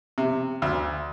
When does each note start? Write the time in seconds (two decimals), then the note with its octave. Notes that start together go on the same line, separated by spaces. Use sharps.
0.18 C3
0.62 D2